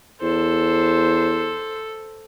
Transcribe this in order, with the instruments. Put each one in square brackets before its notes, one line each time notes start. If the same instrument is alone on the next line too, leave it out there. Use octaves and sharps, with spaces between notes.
[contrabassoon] E2 [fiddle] A4 [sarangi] C5